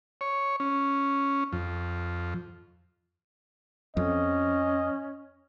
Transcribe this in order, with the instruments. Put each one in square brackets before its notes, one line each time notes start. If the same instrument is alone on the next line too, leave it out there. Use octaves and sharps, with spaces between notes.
[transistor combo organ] C#5
C#4
F2
[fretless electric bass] F2 [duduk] C#4 [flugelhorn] D#5